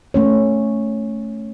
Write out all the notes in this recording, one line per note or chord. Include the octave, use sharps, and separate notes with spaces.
A3 C#4 C#5